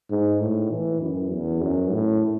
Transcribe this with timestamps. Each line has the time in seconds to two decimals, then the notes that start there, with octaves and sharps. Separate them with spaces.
0.10 G#2
0.40 A2
0.71 E3
1.00 F#2
1.31 E2
1.61 F#2
1.91 A2